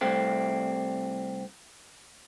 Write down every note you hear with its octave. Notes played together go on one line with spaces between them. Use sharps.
C2 A3 C4